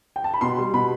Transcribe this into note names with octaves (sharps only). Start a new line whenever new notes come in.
G5
A5
B5
B2 C6
G3
B2 B5